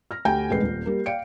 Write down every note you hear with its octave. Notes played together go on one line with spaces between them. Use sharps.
F6 A#6
D2 G4 G5 G#5 G6
E1 A1 G#3 B4 C7
D#1
G3 A#3
D5 F5 G5 C#7 D7